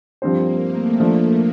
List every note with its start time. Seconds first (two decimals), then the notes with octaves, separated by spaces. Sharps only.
0.22 G2 F3 A#3 C4 G4 C5
0.61 A3
1.00 F3 A3 D4